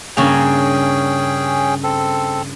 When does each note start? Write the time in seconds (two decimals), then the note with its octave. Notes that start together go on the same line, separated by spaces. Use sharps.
0.17 G2 C#3 A#3 C#4 G#4 G5
1.83 C4 A4